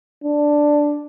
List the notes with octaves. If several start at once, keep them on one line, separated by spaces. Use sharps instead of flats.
D4